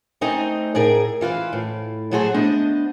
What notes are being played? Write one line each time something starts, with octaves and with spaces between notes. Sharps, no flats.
A3 C4 D#4 C5 D#5 G#5
A2 G#4 A#4
E3 F4 B4 C5
A2
A2 F#3 A3 F#4 G#4 C5
A3 B3 D4 C5 D#5